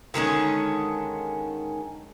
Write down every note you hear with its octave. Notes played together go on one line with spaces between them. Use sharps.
D3 D#3 G#3 C#4